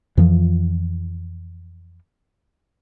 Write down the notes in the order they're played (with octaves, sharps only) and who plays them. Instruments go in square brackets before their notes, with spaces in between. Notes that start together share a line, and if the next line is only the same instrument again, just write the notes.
[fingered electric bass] F2 E3 F3